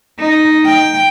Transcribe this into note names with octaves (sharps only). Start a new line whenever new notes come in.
D#4
G5